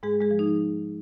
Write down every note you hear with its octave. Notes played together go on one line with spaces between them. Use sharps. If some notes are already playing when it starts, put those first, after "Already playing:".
G#2 G#3 G#4
G#3 G#4
F3
D#4